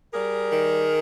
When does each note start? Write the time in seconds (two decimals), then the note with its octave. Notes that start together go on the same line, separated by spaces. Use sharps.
0.13 G3 G#4 A#4
0.52 D#3